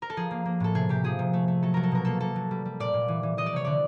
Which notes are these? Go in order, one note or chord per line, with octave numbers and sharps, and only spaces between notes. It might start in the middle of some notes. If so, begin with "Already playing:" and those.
A#4
A4
F3 G#4
A#3
A#3
A2 A4
C3 G#4
C3 G4
F3 G#4
C3
A3
A3
F#3 A4
F#3 A#4
A4
B2 A#4
A#3 A4
A#3 A4
F#3
G3
G3
A#2 D5
A#2
E3
E3
E3 D#5
D5
C3 C#5
D3 D5